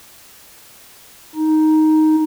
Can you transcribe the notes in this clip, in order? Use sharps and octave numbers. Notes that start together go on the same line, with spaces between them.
D#4